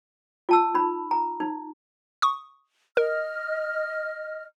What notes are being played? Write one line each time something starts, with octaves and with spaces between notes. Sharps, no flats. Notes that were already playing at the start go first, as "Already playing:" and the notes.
F4 A5 E6
D#4 B5
A#5
D#4
C#6 D#6
A#4 D#5 F6